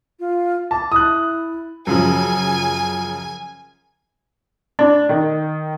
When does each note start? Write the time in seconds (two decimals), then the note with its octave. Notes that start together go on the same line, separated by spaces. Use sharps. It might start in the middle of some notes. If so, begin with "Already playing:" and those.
0.20 F4
0.71 A5 D6
0.92 E4 D#6 F#6
1.87 F#2 C#3 F3 G#5
4.79 D4
5.09 D#3